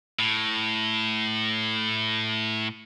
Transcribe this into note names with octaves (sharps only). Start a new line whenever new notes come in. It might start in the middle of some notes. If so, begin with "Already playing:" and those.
A2